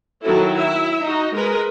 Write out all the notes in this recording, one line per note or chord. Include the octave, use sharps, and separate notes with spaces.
D#3 F#3 E4 F#4 A4
E4 E5
D#4 F#4
G#3 A#4 B4